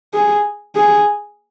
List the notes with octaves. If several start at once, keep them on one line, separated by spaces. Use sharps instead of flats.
G#4
G#4